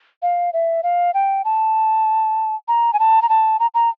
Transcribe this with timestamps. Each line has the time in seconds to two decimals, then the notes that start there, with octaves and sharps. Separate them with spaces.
0.22 F5
0.53 E5
0.83 F5
1.14 G5
1.45 A5
2.68 A#5
2.93 G#5
2.99 A5
3.22 A#5
3.29 A5
3.60 A#5
3.75 A#5